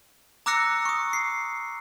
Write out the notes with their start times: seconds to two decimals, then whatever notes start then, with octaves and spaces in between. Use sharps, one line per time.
0.46 A#5 D6 E6 F#6 A#6 C#7
0.85 C#6 D#6
1.13 C7